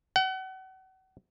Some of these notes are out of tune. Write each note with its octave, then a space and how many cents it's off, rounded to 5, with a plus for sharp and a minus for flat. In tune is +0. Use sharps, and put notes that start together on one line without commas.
F#5 +35